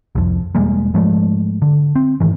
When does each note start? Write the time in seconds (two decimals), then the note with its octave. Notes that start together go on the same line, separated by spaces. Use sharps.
0.15 C2 F2
0.55 E1 G3 G#3 A#3
0.94 G#2 F3 G#3 A3
1.62 D3
1.96 C4
2.20 G#2 D#3 E3